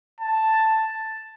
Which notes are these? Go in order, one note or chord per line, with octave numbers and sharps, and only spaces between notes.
A5